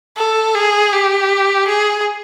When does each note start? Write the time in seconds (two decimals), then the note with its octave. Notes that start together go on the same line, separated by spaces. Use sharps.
0.17 A4
0.55 G#4
0.93 G4
1.68 G#4